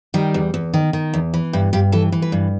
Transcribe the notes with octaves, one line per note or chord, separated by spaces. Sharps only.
D#3 G3
E2
E2
D#3
D#3
E2
E3
G2 E4
G2 G4
E3 A4
E3
B4
G2